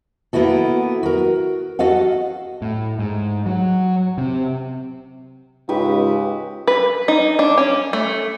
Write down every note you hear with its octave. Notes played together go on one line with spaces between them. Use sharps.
A#3 B3 E4 F#4 A4
F#4 A#4
F#4 A4 D#5 F5 F#5
A2
G#2
F#3
C3
C#2 G#2 G4 B4 C#6
B4
D#4
D4
C#4
A3